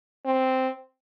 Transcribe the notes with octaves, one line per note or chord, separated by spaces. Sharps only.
C4